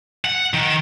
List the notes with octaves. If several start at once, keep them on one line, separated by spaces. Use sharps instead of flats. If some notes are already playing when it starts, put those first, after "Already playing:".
F#5
D#3